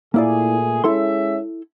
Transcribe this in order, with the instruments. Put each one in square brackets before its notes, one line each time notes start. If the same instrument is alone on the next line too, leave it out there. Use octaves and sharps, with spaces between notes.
[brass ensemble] A#2 A3 G#4 [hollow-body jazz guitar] A#3 E4 D5
[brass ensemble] G#3 C#4 E5 [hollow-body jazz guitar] E4 A4 C6